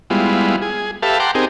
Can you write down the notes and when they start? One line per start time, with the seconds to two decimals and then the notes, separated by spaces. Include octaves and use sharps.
0.10 G3 G#3 B3 E4 F4
0.62 G#4
1.02 G4 A4 B4 E5 F5 A5
1.20 F#5 G5 A5 A#5 C6 D6
1.35 C4 D#4 G4 G#4 A#4